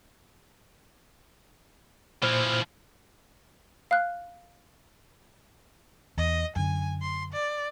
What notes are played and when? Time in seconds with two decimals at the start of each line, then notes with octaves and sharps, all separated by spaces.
2.23 A#2 E3 F3 C5 F6
3.91 F5 F6 F#6
6.17 E2 D#5
6.56 F#2 D3 G#5
7.02 C6
7.33 D5